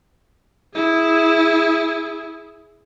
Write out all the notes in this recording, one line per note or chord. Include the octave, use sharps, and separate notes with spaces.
E4 G#4